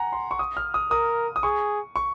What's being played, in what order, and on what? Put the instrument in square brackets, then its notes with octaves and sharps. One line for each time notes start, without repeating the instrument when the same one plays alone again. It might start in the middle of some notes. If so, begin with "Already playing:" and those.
Already playing: [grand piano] F#5 G#5 A#5
C6
C#6
D#6
F6
D#6
[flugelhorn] A#4 [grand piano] D#6
[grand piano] D#6
[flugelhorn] G#4 [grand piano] C#6
[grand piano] C#6